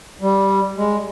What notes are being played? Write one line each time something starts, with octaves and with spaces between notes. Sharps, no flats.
G3
G#3